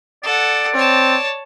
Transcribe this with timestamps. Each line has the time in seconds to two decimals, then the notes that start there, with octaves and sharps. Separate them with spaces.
0.23 A4 D5 F#5
0.75 C4 C#5 A5